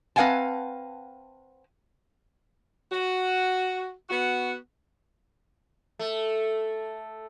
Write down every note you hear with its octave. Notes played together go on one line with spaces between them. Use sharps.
C4 B4 F5 F#5 G#5 A5
F#4
B3 F#4
A3